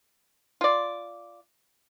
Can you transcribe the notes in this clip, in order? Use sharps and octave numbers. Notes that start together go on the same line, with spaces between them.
F4 D5